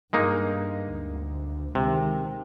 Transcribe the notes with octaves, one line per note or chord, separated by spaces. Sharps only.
G2 G#3 A#3 D#4
D2
C3 D#3 G#3